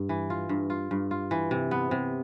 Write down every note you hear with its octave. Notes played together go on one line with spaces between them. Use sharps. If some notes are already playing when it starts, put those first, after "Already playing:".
Already playing: G2
E3
F4
G2
F4
G2
F4
E3
C3
B3
C3